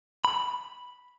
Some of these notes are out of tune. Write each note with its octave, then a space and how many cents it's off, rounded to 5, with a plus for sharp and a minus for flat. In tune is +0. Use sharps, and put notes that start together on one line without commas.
B5 -5